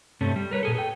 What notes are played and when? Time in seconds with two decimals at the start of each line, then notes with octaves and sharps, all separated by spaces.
0.21 G2 C3 A3 C#4
0.36 G3
0.51 A#4 B4 C#5
0.63 A#2 G#4 A4
0.75 G#4 A4 G5